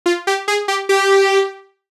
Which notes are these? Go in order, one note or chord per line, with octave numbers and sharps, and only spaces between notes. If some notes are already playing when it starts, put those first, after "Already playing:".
F4
G4
G#4
G4
G4